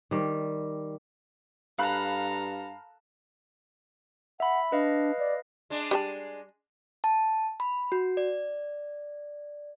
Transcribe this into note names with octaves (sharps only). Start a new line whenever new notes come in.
D#3 G3
G2 A4 F5 A#5 B5 F#6
E5 F#5 B5
D4 B4 D#5 F5
D5
G#3 D4
G3 C5 A5
A5
B5
F#4
D5